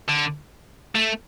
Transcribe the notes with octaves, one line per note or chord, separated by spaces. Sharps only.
D3
A3